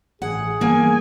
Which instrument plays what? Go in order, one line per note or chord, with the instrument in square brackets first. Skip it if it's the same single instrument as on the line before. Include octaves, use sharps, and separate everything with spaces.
[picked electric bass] A1 [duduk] G#4 [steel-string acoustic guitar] F#5
[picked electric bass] E3 G3 B3 [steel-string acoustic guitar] A#3 [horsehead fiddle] G#5